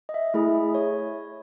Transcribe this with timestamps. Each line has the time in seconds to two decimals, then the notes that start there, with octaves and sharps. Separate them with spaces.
0.09 D#5
0.14 E5
0.34 A3 E4 G#4
0.74 C#5